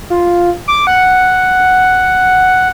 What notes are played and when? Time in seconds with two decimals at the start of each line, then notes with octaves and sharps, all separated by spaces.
0.10 F4
0.68 D6
0.87 F#5